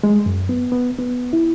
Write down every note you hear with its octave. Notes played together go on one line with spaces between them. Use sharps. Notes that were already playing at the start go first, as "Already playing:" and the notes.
G#3
F#2
B3
B3
B3
E4